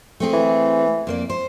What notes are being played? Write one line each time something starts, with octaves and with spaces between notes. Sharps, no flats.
A3 C4 G#4
E3
F2 A#3 D5
C5